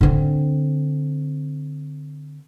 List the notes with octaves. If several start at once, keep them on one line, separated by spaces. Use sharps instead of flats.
D3 C4